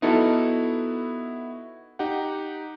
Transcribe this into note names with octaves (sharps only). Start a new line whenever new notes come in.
B3 D#4 E4 F#4 A4
D#4 G4 F#5